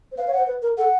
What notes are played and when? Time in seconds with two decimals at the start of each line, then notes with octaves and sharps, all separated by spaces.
0.12 C5
0.17 B4 F5
0.27 C#5
0.33 F#5
0.38 C5
0.47 B4
0.62 A#4
0.78 A4 F#5